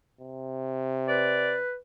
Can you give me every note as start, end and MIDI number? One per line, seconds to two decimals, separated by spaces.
0.21 1.62 48
1.08 1.76 71
1.08 1.55 74